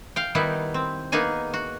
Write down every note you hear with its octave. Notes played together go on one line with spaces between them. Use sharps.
F5 G5
D#3 G3 B3 D#4 E4
C4
A#3 B3 D#4 G#4 G#5
F#4